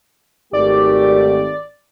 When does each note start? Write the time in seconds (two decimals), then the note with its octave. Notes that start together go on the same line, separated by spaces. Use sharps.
0.53 G#1 A3 G4 D5